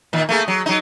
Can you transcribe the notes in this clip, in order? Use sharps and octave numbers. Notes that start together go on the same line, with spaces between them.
A#2 D#3
A3 A#3 G#4
F#3
F#3 D#4